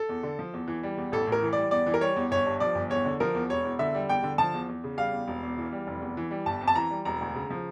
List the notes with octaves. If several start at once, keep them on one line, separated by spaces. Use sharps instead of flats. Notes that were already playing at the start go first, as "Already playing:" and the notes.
Already playing: A4
E2
D3
F3
E2
E3
G3
E2
A1 A4
A2 A#4
E3
G3 D5
E2 D5
E3
A#4
G3 C#5
E2
G1 C#5
G2
F3 D5
G1
E2 C#5
D3
F3 A#4
E2
E1 C#5
E2
D3 E5
G3
E2 G5
D3
F3 A5
E2
E2
C#3
G3 F5
E2
E1
E2
E3
G3
F1
E2
E3
G3
G1 A5
F2
A5
E3 A#5
G3
E1 A#5
D2
C#3
F3